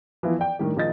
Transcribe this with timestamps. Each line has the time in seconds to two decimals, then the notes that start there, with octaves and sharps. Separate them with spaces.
0.23 E3 F3 B3 E4
0.39 D5 G5
0.59 A2 D#3 G3 D4 G4
0.77 A#1 D#3 D#5 A6